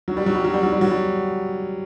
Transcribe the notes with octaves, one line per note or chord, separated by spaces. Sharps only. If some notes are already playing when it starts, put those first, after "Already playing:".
F#3
G3
F#3
G3
F#3
G3
F#3
G3
F#3
G3